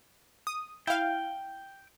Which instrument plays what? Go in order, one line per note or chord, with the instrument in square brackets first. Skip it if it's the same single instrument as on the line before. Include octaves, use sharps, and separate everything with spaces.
[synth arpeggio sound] D#6
[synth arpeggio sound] E4 F5 [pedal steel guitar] G5